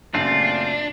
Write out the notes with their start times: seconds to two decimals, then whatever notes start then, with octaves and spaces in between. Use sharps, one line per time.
0.14 F#2 A#2 C#3 A3 C4 D4 F4